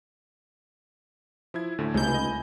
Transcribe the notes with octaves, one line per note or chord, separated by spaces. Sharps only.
F3 E4 E5 G#6
D2 A2 D3
C#2 C3 A3 D#4 G#5 B5 G6
D#5